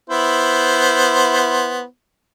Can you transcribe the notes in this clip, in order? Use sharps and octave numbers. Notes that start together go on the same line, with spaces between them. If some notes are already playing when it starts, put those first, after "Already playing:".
B3 E4 C5